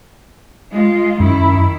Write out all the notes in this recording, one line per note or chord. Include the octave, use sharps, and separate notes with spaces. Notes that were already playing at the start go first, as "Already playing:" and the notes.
G#3 F4
F#2 D#3 E4